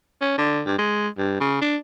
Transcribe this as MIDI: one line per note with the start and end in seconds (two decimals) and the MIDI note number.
0.21 0.33 61
0.38 0.61 50
0.66 0.75 43
0.78 1.08 56
1.18 1.37 43
1.40 1.59 49
1.61 1.76 62